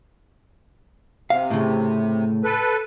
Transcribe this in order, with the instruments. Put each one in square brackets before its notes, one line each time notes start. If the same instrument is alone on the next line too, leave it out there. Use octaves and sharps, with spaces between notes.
[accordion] C3 [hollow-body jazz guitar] F5
[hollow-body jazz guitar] A2 C#3
[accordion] A4 B4